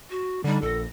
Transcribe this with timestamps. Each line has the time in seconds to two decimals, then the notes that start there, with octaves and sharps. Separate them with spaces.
0.10 F#4
0.44 D3 G3 D#4
0.62 A#1 A4 A#6